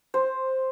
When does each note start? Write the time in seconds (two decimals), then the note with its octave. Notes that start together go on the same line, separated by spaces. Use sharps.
0.14 C5